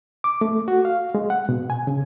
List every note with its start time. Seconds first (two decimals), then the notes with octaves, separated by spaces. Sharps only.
0.24 D6
0.41 A3
0.68 F#4
0.85 F5
1.15 G#3
1.30 F#5
1.49 B2
1.70 G#5
1.87 C#3